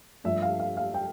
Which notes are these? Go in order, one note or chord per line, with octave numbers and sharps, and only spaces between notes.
G2 F3 A3 D4 E5
F5
F5
F5
G5